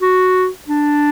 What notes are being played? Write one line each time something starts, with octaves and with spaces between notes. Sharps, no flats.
F#4
D4